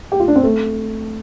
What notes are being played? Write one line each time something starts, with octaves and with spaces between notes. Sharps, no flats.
G4
F4
D4
C4
A3